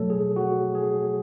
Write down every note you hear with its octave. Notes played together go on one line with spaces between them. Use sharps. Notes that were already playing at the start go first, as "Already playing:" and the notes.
Already playing: B2 F#3 A3 A4 C#5
G#4
F#4
G#4